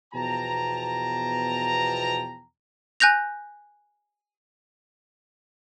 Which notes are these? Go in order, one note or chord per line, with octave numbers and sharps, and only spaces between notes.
E2 B2 F3 G5 A5 A#5
G#5 F#6 G6 A#6 F7